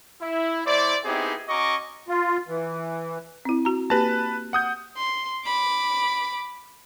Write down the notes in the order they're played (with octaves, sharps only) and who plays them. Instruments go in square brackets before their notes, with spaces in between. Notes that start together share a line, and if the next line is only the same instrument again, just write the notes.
[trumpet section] E4
A3 E4 C5 D5
B3 C4 D#4 E4 G4 G#4
C#4 F#4 D#5 A#5 C#6 D6
[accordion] F4
E3
[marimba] C4 E4
F#4 A#5
[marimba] A#3 G4 [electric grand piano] B4 A5
[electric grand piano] F#5 D#6 G6
[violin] C6
B5 D6